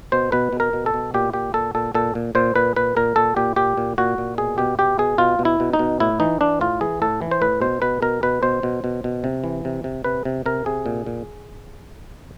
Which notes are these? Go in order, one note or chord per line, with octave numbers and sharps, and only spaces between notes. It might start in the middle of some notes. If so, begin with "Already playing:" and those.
B2 C5
B2 B4
B2
A#4
B2
A4
B2
A#2 G4
A#2 G4
A#2 A4
A#2 A4
A#2 A4
A#2
A#2 C5
A#2 B4
A#2 B4
A#2 A#4
A#2 A4
A#2 G4
A#2 G4
A#2
A#2 F#4
A#2
B2 G#4
B2 G4
B2 G4
B2 G#4
B2 F4
B2
E4
B2
D#4
B2
A2 E4
E3 D#4
E3 D4
A2 F4
E3 G#4
A2 A4
E3
C5
A2 B4
B2 C5
B2 B4
B2 A#4
B2 B4
B2 C5
B2
B2
B2
C3
E3
C3
C3
C3 B4
C3
C3 A#4
C3 G#4
A#2
A#2